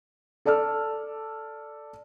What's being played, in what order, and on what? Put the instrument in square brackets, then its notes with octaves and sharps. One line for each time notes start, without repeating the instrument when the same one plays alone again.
[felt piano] A4 D5 A5 E6 F6